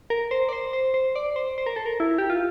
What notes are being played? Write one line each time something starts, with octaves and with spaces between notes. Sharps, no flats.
A#4
C5
D5
C5
C5
C5
D5
C5
C5
A#4
A4
A#4
E4
G4
F4